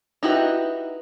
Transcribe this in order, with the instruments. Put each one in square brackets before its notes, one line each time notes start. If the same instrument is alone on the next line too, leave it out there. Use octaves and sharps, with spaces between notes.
[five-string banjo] D#4 E4 F#4 G4 B4